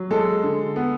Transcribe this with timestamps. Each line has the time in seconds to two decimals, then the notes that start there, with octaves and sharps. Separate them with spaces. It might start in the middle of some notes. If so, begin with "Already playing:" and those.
Already playing: F#3
0.11 G#3 A4
0.43 D3
0.76 B3